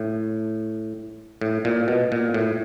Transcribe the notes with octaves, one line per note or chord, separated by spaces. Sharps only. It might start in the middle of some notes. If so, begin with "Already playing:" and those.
Already playing: A2
A2
A#2
B2
A#2
A2